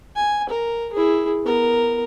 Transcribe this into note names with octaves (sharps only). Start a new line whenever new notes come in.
G#5
A#4
E4 G#4
B3 A#4